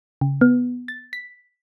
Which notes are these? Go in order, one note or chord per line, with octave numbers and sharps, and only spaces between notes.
C#3
B3
A6
B6